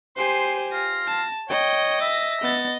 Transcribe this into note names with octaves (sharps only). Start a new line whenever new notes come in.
G4 C5 G#5 C6 D#7
F4 A#6
A5
C#5 D#5 G5
E5 A6 A#6
B3 D#5 A6